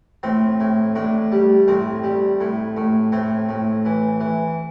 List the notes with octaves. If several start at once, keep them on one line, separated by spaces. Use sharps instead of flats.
A2 C4
A2
A2 D4
G3
A2 C4
G3
A2
A2
A2 C4
A2
E3
E3